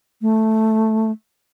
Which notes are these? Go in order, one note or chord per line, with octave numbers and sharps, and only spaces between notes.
A3